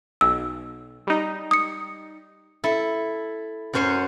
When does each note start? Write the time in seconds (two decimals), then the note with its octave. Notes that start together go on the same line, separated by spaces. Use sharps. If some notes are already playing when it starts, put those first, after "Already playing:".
0.21 B1 E6
1.07 G3 D#4
1.51 D#6 C#7
2.64 E4 A4
3.73 F#2 F#3 C#4 C5 C#5